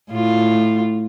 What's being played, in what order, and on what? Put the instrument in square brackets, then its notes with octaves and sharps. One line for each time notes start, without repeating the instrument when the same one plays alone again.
[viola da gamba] A2 F4